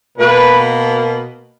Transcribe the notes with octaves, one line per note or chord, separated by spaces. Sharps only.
B2 A#3 B4